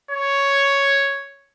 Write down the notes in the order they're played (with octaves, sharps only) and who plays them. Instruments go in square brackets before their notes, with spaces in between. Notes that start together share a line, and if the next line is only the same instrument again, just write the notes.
[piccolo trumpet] C#5